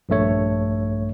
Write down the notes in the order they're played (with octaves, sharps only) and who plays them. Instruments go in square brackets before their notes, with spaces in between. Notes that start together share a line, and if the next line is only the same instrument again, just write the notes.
[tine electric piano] A#1 G2 A3 C#5